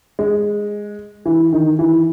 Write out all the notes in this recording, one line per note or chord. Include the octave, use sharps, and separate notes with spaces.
G#3
E3
D#3
E3